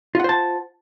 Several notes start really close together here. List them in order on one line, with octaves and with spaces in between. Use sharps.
F4 F#5 C5 A5